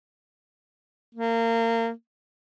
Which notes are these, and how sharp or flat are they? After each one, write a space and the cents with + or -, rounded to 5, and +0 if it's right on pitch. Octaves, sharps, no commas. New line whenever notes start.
A#3 -25